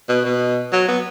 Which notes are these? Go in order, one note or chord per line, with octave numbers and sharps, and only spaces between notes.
B2
B2
F#3
B3